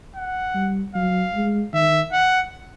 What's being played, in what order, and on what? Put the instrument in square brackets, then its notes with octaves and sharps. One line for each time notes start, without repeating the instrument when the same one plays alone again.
[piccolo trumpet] F#5
[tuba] G3
[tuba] F#3 [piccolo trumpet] F5
[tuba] G#3
[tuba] D#3 [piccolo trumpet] E5
[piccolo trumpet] F#5